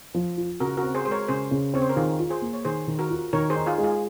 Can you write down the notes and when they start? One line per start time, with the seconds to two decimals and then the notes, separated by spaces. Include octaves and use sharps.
0.14 F3
0.37 F4
0.60 C#3 F#4 A#4
0.77 F#4 A#4
0.82 C4
0.95 G#4 C5
1.05 G#3 C5
1.11 A#4 C#5
1.28 C#3 G#4 C5
1.51 C#3
1.74 C4 C#5
1.82 C5
1.89 A#4
1.96 D#3 F4 G#4
2.19 F4
2.30 G#4 C5
2.42 A#3
2.53 C#5
2.64 D#3 G#4 C5
2.88 D#3
2.99 F#4 A#4
3.10 F4
3.33 D#3 A#4 C#5
3.50 G#4 C5
3.56 D#4
3.66 F4 G#4
3.78 G#3
3.84 F4 G#4